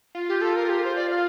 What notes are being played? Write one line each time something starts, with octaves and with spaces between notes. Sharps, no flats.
F4
G4
A4
A#4
G4
C5
D5
F5